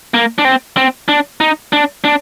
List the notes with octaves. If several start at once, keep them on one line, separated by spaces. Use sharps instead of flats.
A#3
D4
C4
C4
D4
D#4
D4
D4